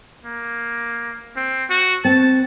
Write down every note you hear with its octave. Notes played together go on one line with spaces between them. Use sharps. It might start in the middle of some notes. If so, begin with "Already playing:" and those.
A#3
C4
F#4
C4 A5